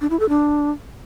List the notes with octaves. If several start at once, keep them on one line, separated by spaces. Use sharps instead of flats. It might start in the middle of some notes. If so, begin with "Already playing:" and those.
D4
E4
A4
D4